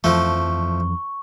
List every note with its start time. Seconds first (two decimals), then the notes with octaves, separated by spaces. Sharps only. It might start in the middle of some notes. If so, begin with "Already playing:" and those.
0.04 F2 E3 F3 A3 C#6